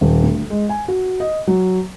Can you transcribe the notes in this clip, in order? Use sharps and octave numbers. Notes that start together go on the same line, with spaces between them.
D#1
D2
G#3
G#5
F#4
D#5
F#3